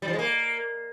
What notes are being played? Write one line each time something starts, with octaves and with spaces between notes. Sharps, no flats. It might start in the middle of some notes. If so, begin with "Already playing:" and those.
G3
F3
G#3
A#3